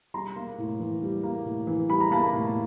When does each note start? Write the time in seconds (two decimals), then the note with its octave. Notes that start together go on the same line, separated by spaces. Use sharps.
0.14 G3 A#5 C6
0.36 A#3
0.58 A2
0.80 E3
1.02 G3
1.23 A#3
1.45 A2
1.67 E3
1.89 G3 B5
2.01 A#5
2.11 A#3 A5 B5
2.33 A2